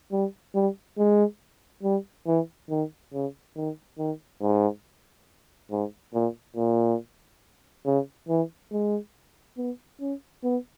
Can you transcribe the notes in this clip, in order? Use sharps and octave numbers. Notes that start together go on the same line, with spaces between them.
G3
G3
G#3
G3
E3
D#3
C#3
D#3
D#3
G#2
G#2
A#2
A#2
C#3
E3
G#3
B3
C#4
B3